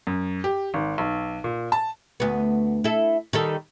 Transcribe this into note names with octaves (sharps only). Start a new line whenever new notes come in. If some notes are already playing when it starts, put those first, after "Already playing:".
F#2
G4
G#1
B1
A#2
A5
D2 B3
E4 A4
D#3 G3 A4